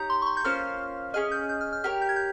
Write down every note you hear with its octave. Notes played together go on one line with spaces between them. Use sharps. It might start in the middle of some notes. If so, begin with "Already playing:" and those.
Already playing: D#4 G4 C#5 A#5 G6
C6
C#6
C6
G6
A#3 C#4 F4 C5 F6
C#4 G#4 D#5 F6
G6
G6
F6
F6
G4 A#4 C#5 F6
G6
G#6
G6